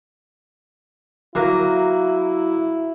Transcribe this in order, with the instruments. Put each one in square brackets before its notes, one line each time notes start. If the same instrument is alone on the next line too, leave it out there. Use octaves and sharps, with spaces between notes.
[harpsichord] F#3 A#3 [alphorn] E4